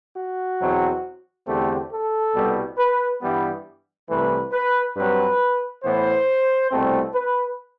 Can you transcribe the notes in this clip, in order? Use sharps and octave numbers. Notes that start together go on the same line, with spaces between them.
F#4
E2 B2 F#3 C4
E2 D3 A3 C4 G4
A4
C2 B2 G3 B3
B4
G2 E3 G3 B3
C2 C3 E3 A3 B4
B4
G2 F#3 C4 B4
A2 E3 B3 C5
C2 B2 A3 C4
B4